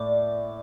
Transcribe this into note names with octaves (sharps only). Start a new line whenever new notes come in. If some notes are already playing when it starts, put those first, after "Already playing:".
Already playing: A2 D5